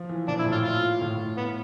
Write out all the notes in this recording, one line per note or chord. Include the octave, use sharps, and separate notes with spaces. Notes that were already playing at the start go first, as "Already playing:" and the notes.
Already playing: F3
E3
A#2 D4
E4
A2
F4
F4
A2
B3